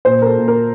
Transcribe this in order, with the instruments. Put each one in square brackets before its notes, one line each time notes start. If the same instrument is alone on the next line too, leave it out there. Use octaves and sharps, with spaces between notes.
[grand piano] A#2 C5
A#4
A4
A#2
A#4